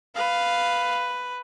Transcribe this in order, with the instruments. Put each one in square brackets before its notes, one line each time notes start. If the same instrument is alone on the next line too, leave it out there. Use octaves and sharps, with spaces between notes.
[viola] B4 [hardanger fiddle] F5